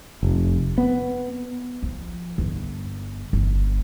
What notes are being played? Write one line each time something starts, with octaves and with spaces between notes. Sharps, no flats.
F1
B3
F3
G1
G1